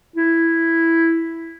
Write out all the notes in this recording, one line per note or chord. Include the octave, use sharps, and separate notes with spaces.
E4